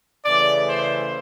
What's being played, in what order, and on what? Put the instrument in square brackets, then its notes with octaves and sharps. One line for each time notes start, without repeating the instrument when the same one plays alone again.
[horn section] C#3 E3 A3 D5
C5